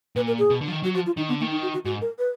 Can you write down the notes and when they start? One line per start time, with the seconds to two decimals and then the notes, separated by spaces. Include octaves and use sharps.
0.16 A#2 B4
0.27 A#4
0.39 G#4
0.50 B2
0.61 D3
0.68 F3
0.72 D#3
0.83 F#3 F#4
0.94 F3 F#4
1.06 F4
1.17 D#3 D#4
1.29 D3 B3
1.40 D#3 A#3
1.51 D#4
1.62 F#4
1.74 F#4
1.85 G#2 F#4
2.01 A#4
2.19 B4